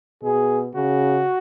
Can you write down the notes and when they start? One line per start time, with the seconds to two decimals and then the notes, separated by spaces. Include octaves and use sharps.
0.23 B2 G#4
0.75 C#3 F#4